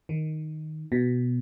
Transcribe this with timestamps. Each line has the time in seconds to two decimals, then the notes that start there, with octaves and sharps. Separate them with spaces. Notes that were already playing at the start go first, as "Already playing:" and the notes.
0.09 D#3
0.92 B2